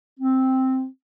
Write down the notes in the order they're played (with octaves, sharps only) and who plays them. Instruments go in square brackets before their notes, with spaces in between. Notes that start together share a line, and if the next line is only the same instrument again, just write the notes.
[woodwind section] C4